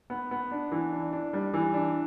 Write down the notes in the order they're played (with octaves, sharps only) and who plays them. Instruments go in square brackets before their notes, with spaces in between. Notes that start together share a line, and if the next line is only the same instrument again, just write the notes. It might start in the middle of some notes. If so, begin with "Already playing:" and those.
[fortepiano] B3
B3
D4
E3
D4
D4
G3
E3
D4